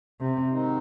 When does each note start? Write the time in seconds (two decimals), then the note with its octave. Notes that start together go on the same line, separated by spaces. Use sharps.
0.21 C3
0.50 G#2 D#3 G#3 C4 D#4